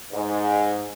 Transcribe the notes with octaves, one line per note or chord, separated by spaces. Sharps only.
G#2